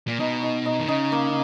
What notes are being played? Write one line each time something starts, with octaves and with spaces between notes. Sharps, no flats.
A#2
B2 D#4
D#4
D#4
D#3
C#3 D#4
A#3